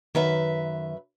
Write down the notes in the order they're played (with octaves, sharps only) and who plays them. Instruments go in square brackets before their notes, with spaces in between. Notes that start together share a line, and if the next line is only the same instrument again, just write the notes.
[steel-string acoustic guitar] F#2 B4 E5 [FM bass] D#3